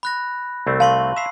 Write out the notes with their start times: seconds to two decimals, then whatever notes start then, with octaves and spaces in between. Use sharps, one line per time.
0.03 B5 F#6 A#6
0.67 C2 A3 C4
0.80 F5 A5 C6 C#6
1.16 E5 A#5 E6 C7